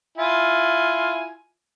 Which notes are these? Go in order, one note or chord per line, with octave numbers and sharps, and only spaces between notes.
E4 F4 G#5